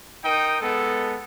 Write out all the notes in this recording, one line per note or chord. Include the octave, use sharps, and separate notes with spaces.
D#4 A#4 G5 D#6
G#3 B3 A4